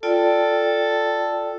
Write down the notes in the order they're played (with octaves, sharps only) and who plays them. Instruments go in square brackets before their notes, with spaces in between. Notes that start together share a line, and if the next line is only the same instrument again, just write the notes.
[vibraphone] F4 D5 G5 [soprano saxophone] A4